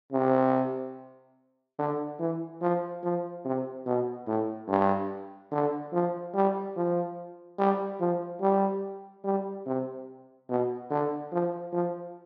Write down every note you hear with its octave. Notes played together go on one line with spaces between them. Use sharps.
C3
D3
E3
F3
F3
C3
B2
A2
G2
D3
F3
G3
F3
G3
F3
G3
G3
C3
B2
D3
F3
F3